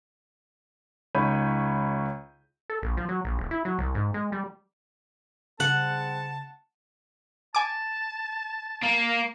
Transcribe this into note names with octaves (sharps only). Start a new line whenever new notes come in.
C#2 D#4 C#5 B5 G6 D#7
A4
A#1
F3
F#3
A#1
D#1
E4
F#3
C2
G#2
G#3
G3
C#3 G3 C4 G#4 F#5 A5
G#5 A5 D6
A#3